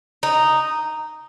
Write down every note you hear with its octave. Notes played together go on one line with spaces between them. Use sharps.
D#4